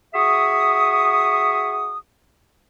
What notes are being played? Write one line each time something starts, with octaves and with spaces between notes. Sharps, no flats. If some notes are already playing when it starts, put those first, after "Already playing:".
F#4 G#4 E5 C#6 D#6